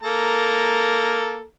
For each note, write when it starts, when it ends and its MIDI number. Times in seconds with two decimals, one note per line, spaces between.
0.03 1.44 58
0.03 1.44 69
0.03 1.44 82